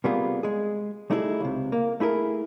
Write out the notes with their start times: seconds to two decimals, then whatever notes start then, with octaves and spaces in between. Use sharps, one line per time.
0.04 C3 G3 A#3 B3 F4 G#4
0.43 G#3 G#4
1.10 G3 A3 D#4 E4 G#4
1.40 C#2 C3
1.72 A#3
2.00 A3 E4 G#4 A#4